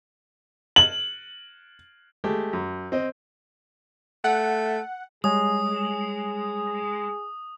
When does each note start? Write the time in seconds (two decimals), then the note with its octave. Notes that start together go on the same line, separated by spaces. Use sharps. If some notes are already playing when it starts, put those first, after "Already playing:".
0.76 F#7
2.24 G#3 A3 G4
2.53 F#2
2.92 C4 D#5
4.24 A3 F#5
5.24 G3 G#3 G#4 C#5 G#5 D#6